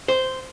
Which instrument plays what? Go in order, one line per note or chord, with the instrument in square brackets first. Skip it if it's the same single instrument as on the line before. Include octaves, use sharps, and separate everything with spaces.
[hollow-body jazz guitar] C5